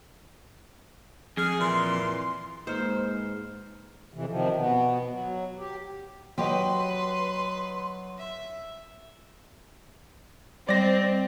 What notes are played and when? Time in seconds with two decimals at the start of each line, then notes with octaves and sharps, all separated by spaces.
1.37 F2 G#4 F6
1.59 A#2 E3 C6
2.67 G#2 A#3 D#4 B4 C5 F6
4.14 F2 C3 E3
4.29 C3 D#3 F3
4.56 B2 B3
5.11 F#3
5.58 G4
6.38 F#3 G4 B4 D#5 C6
8.18 E5
10.69 G3 C4 D5 D#5 A#6 E7